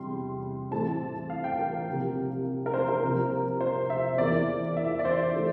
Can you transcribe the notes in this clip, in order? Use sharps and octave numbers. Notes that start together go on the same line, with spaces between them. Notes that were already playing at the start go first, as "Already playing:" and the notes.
Already playing: E2 C3 G3 C6
A2 E3 A3 C4 A5
F5
G5
A#4
C2 C3 F3 A#3
A#4
C5
A#4
C2 C3 F3 A#3
C5
E5
E2 E3 A#3 D5
E5
D5
C5
E3 A3